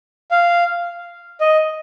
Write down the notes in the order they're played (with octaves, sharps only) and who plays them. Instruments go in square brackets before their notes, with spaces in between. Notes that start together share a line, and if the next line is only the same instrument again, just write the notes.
[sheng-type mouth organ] F5
D#5